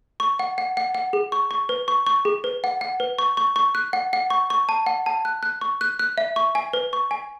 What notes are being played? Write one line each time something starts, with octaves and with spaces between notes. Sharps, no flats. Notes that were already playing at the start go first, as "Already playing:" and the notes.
C#6
F#5
F#5
F#5
F#5
G#4
C#6
C#6
B4
C#6
C#6
G#4
B4
F#5
F#5
B4
C#6
C#6
C#6
F#6
F#5
F#5
C#6
C#6
A5
F#5
A5
F#6
F#6
C#6
F#6
F#6
E5
C#6
G#5
B4
C#6
G#5